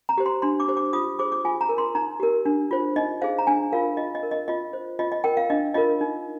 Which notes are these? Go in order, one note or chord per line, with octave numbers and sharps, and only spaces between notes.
A#5
G4 C5
C6
D4 C6
D6
G4 C5
D6
F4 D#6
G#4 C5 D6
D6
F4 G#5
A#5
A#4
C6
D#4 A#5
G4 A#4
D4
F4 C5
D#4 D#5
G#4 C5 F5
A#5
D4 G#5
F4 A#4 F5
F4 D#5
D#5
A#4
D#5
F4 D#5
C5
F4 D#5
D#5
A#4 G5
F5
D4 D#5
F4 A#4 D#5
D#4